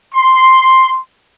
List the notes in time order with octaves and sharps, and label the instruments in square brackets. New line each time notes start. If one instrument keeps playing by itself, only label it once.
[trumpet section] C6